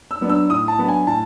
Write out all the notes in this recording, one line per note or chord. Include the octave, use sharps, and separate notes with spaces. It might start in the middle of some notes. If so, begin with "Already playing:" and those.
E6
F#3 B3 D4
E6
A2 D#6
A5
F#3 B3 D4
G#5
A2 A5